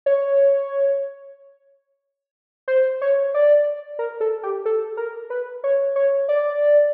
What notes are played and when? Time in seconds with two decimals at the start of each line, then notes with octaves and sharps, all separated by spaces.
0.06 C#5
2.68 C5
3.02 C#5
3.34 D5
3.99 A#4
4.21 A4
4.43 G4
4.66 A4
4.97 A#4
5.30 B4
5.64 C#5
5.96 C#5
6.29 D5